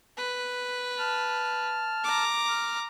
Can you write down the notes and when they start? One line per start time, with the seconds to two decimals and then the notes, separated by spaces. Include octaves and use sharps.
0.17 B4
0.98 A5 F6
2.03 A#5 D6
2.47 F6